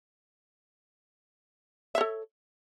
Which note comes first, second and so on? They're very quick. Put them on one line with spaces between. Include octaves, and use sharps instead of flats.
E5 C#5 A4